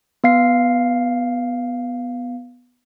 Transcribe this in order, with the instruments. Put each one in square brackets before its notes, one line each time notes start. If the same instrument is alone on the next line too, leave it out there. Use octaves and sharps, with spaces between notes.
[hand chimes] B3 F5 C7